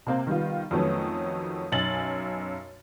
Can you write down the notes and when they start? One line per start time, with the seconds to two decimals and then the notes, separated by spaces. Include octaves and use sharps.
0.06 C3 A#3 C4
0.27 D#3 G3 B3 F4
0.71 F2 D#3 F#3 A3 B3 C#4
1.72 B1 F#2 G#5 A6 F#7